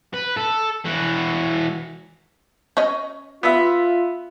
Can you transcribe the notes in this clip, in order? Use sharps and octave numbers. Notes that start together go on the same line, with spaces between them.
B4
A4
E3 F#4
C#4 C#5 D#5
B3 F4 E5